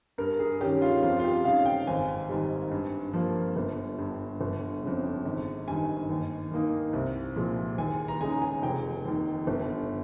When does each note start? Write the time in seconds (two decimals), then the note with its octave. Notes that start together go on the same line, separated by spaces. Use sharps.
0.18 G2 A#4
0.39 G#4
0.61 D#3 G3 C#4 G4
0.82 F4
1.03 F2 F4
1.19 F4
1.24 G4
1.45 C#3 G#3 D#4 F5
1.65 G5
1.87 G#1 G#5
2.29 G#2 D#3 G3
2.71 G2
3.13 F3 A#3
3.56 G1
3.98 G2 G3
4.41 G1
4.83 F2 C#3
5.26 G#1
5.67 G2 D#3 G#5
6.10 D#2
6.51 D#3 A#3 D#4
6.93 C2
7.36 A#2 F3 G#3
7.78 D#2 G#5
8.08 A#5
8.21 C#3 G#3 D#4 G#5
8.42 G#5
8.62 F1 G5
9.05 D#2 D#3
9.47 G1